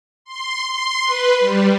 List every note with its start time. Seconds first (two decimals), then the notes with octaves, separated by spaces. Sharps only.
0.25 C6
0.72 C6
1.05 B4
1.40 G3